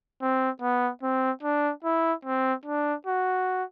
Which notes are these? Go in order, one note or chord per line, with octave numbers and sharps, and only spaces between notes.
C4
B3
C4
D4
E4
C4
D4
F#4